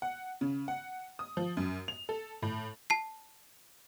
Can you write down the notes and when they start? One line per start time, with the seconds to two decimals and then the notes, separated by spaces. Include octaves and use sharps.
0.02 F#5
0.41 C#3
0.68 F#5
1.19 D#6
1.37 F3
1.57 F#2
1.88 F7
2.09 A4
2.42 A2
2.90 A5 C7